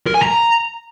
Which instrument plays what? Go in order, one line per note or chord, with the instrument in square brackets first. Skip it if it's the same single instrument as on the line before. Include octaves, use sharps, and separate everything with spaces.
[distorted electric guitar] A#4
G#5
A#5